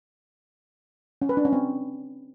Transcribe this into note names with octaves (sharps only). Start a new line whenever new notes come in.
C#4
B4
D4
C#4
C4